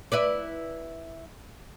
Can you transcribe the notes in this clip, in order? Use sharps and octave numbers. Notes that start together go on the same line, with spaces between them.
E4 B4 D5